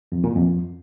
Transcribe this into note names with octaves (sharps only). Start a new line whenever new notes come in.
F2
A#2
F2